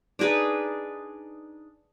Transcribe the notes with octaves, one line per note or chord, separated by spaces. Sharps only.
D4 D#4 G#4 B4